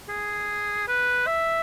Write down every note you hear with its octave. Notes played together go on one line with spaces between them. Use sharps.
G#4
B4
E5